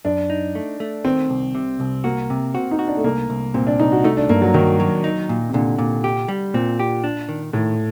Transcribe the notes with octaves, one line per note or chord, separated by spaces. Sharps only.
F#2 D4
D#4
A3
A3
D#3 C4
C2
C3
C2
A#3 F#4
C3
C4 F#4
D#4
F#4
D4
A3
C2 A#3
C2
A#2 C4
D4
C2 D#4
F#4
A3 D#4
D4
G2 A#3
F#3
D#3 F#3
F#3
D#4
A#2
C3
A#2 D3
A#2
G4
G3
A#2 C4
G4
D4
D#3
A2 D#3